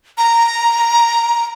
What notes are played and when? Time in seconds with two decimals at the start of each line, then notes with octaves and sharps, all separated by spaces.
0.18 A#5